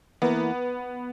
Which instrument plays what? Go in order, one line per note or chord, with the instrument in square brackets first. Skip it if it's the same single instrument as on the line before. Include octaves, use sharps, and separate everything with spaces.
[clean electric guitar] E3 A#3 E4 A#4 [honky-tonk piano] B3